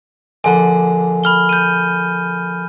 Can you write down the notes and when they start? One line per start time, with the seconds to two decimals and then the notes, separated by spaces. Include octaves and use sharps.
0.44 A#1 D3 F#5 G#5 A5
1.24 B5 F6 G7
1.49 G6 D#7